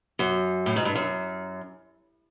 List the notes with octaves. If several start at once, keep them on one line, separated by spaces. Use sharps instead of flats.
F#2
A2
G#2
G2
F#2